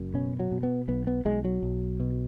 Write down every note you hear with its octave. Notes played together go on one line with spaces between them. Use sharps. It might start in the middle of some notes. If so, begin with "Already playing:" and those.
Already playing: F#1 F#2
B2 C#4
F#3
B2
B3
B1 B3
B3
B1 G#3
F#3
B1
B2